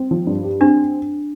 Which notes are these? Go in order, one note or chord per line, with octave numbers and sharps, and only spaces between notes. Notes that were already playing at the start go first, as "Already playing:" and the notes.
Already playing: C4
F3
G2
G4
C4 D4